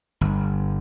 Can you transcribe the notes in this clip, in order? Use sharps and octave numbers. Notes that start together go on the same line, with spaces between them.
G1